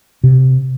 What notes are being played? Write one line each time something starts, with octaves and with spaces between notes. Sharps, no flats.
C3